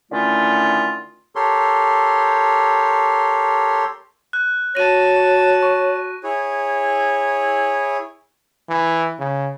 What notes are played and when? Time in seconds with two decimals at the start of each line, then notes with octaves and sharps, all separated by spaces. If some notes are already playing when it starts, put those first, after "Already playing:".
0.11 D3 D#3 A3 C#4 E4 F4
1.35 G4 A4 A#4 C#5 C6
4.33 F#6
4.75 F#4 C#5 A5 A#6 D#7
5.63 C#6
6.23 E4 G#4 C#5
8.69 E3
9.19 C#3